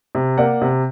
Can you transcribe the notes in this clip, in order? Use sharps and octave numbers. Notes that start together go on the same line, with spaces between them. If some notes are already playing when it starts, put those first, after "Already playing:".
C3
A#3 D5 F#5
C3